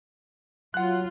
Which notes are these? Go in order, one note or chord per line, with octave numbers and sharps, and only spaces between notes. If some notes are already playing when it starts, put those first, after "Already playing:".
F#3 F4 F#5 F#6